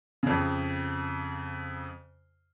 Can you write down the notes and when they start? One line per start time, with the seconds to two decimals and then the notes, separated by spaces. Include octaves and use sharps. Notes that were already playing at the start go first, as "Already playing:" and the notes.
0.23 F2 C#3